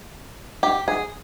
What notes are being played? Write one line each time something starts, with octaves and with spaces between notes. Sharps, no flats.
G4
G#4